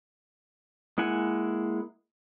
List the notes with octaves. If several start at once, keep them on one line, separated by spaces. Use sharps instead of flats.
G#3 A#3 E4 F#5 G#5